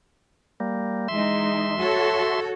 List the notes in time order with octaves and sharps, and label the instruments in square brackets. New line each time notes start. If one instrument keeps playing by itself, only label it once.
[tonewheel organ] G3 A#3
[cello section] E3 G#3 D#4 [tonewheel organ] E5 C6
[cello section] F#4 A4 C#5